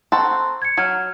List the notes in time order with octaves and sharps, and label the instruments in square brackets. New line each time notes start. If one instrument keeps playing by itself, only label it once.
[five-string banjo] C4 A4 F#5 [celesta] A#5 C6 C#6
[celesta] G#6 C#7
[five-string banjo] F#3 [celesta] F6 G#6